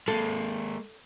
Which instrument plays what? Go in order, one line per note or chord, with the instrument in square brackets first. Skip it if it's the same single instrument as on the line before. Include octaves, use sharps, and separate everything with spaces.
[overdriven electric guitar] G#3 A#3 [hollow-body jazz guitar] A4